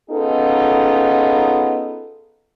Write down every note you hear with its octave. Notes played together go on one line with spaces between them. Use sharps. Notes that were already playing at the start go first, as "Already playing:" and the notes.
B3 C#4 D#4 F4 G#4 A4